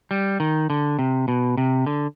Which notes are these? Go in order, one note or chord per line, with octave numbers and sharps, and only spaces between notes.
G3
D#3
D3
C3
B2
C3
D3